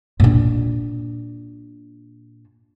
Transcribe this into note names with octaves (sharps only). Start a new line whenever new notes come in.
A#2 D4